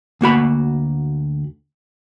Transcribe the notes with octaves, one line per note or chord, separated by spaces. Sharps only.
D2 A#3 F#4 B5